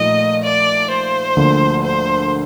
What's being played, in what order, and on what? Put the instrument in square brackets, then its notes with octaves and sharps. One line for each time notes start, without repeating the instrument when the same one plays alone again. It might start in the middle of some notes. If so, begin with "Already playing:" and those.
Already playing: [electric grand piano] A#2 F3 A3 D#4 [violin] D#5
[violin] D5
C5
[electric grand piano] D2 D3 F3 A#3
[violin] C5